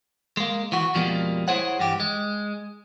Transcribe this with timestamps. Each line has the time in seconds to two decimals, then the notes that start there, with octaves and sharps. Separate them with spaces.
0.37 G#3 A#3
0.72 E3 F#4
0.94 F2 B2 F3 G3 G#3 A#3
1.48 E4 G#4 C5 C#5 F#5
1.80 G2 E3 G4
2.00 G#3